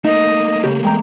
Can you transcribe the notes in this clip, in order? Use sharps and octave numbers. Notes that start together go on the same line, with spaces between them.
A3 A#3 D#4 D#5
C#3 G4
E2 G#3 G5 A#5